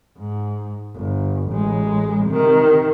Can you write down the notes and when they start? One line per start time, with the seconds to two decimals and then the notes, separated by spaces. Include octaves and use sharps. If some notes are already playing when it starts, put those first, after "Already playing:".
0.18 G#2
0.95 G1
1.49 A1 G#3
2.25 C3 D#3